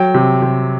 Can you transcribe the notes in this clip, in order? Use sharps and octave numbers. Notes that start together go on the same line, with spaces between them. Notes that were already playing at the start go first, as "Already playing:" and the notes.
Already playing: F#3 G5
C3
C3